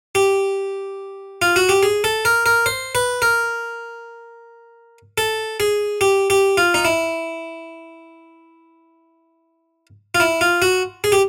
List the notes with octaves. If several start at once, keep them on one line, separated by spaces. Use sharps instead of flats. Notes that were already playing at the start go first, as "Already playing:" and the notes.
G4
F4
F#4
G4
G#4
A4
A#4
A#4
C5
B4
A#4
A4
G#4
G4
G4
F4
D#4
E4
F4
E4
F4
F#4
G#4
G4